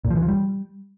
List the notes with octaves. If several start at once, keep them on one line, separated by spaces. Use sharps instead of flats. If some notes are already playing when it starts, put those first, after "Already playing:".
A#2
F3
E3
F3
G3